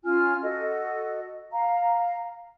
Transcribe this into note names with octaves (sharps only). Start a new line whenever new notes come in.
C#4 F4 G#5 F6
F#4 A4 D#5
F5 A#5